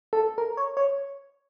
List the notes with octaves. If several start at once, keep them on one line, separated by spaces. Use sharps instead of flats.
A4
A#4
C#5
C#5